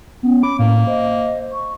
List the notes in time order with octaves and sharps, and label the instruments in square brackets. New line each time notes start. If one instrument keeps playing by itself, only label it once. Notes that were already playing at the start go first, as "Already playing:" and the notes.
[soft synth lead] B3 [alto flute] C#4
[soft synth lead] B5 [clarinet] D6
[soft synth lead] A2 [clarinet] A#3
[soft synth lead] C5 [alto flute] D#5
[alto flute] C#6